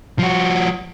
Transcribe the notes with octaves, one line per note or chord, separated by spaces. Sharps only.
F3 F#4